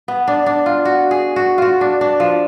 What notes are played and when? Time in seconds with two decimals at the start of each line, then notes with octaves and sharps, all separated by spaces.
0.08 B3
0.28 D4
0.46 D4
0.66 F4
0.85 F#4
1.11 G#4
1.36 F#4
1.58 F4 F#4
1.81 D4
2.01 D4
2.20 F3